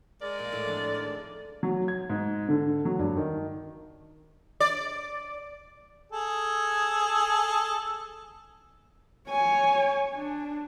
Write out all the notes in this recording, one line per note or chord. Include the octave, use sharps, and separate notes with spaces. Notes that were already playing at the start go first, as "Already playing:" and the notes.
G#3 A#4 D5
A#2
A2
F2 D4
D#3 D#5
F#3
G#6
G#2
D3
F#3
G2
D#3
D5
G#4 A4
C#5 G#5
D4